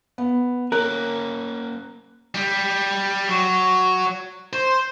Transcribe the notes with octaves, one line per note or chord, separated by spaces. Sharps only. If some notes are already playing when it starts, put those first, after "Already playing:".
B3
A#3 C#4 A#4 F#6
G3
F#3
C5